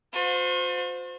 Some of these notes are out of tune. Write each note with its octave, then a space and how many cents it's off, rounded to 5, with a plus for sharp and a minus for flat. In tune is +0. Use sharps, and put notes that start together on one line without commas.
F4 +45 C5 -20